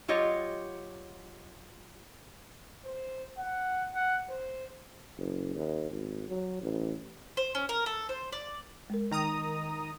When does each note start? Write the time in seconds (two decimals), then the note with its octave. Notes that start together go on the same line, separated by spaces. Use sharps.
0.08 F#3 F4 G4 C#5 D#5
2.85 C5
3.38 F#5
3.95 F#5
4.29 C5
5.17 F#1
5.55 D#2
5.91 G#1
6.28 F#3
6.61 A1
7.37 C5
7.55 C#4
7.69 A#4
7.86 A4
8.09 C5
8.32 D5
8.90 G#3 A#4
9.11 D#3 A#5 D#6